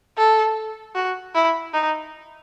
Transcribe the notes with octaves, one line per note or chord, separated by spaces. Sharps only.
A4
F#4
E4
D#4